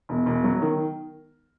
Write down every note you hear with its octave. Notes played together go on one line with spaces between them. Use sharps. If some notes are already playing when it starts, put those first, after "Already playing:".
E1
E1
F#3
D#3